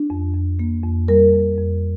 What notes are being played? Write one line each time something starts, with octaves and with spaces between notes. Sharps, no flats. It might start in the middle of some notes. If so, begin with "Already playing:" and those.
Already playing: D4
F2
F2
A#3
F2
G3 A#4
F2
F2